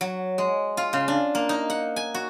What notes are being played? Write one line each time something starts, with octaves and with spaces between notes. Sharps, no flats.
F#3
G#3
F4
C#3
D4
A#3
D#4
F#5
G#5
F#4